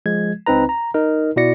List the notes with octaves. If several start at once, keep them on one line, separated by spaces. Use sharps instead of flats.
F3 G#3 G#6
C#2 C4 D#4 B4 A#5
A#5
D#4 A#4
B2 E4 F#4 D5 A#6 C#7